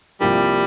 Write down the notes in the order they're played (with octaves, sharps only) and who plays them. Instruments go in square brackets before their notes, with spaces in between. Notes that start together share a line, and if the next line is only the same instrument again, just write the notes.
[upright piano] C2 C3 F3 A#3 [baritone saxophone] G3